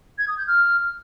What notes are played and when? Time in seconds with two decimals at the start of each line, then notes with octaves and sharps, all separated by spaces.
0.18 G#6
0.28 D#6
0.38 G6
0.47 F6